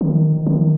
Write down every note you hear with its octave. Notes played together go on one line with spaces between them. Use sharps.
D#3
D#3